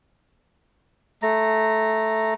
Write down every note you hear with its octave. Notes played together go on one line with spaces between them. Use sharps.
A3 A#5